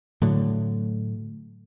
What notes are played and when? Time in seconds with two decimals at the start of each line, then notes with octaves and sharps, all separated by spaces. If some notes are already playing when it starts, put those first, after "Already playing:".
0.21 A2 D3 F#3